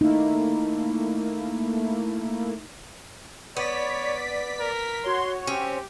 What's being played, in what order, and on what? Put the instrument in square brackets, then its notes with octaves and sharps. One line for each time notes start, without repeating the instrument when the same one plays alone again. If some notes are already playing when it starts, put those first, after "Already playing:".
[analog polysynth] A3 A#3 E4 [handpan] D#4
[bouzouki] B3 [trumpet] C#5 [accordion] D5 [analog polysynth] B6
[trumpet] A#4
[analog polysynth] F#4 C#5 [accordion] C6
[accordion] C4 [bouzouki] C#4 [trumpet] G4